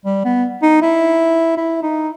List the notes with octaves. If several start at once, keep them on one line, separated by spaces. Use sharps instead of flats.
G3
B3
D#4
E4
E4
D#4